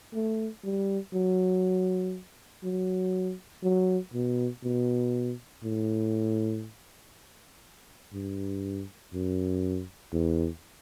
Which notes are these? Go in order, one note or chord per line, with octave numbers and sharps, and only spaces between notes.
A3
G3
F#3
F#3
F#3
B2
B2
A2
G2
F#2
E2